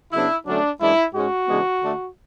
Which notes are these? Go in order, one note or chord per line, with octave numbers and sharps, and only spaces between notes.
C#3 F#3 B3 D4 E4
D3 F#3 A3 C#4 D4
F#2 E3 G#3 D4 E4
G#2 G#3 C#4 F#4
C#3 E3 G#3 B3 D4
D3 A3 D4